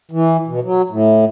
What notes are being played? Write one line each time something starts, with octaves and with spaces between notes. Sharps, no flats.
E3
B2
F#3
A2